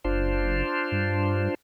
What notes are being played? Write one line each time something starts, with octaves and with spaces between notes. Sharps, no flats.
F#1 D4 F4 C5
G2